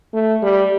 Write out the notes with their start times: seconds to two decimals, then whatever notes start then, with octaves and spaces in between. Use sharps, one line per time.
0.14 A3
0.43 G3